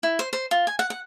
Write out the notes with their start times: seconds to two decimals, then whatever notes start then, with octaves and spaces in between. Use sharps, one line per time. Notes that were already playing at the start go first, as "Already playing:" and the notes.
0.03 E4
0.19 C5
0.33 C5
0.51 F4
0.67 G#5
0.79 F#5
0.90 F#5